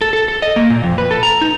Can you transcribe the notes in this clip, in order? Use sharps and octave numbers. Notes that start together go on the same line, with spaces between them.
A4
A4
A4
D#5
A#3
A#2
F2
B4
A4
A#5
D#4